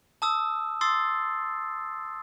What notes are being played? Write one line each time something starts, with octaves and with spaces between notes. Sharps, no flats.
A5 D#6 E6
C6 D#6 E6 A6 C7